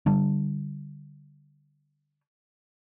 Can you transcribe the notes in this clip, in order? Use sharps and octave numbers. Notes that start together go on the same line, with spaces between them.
D3 G3 D4